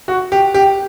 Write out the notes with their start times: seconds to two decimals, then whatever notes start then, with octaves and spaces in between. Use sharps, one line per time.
0.08 F#4
0.32 G4
0.54 G4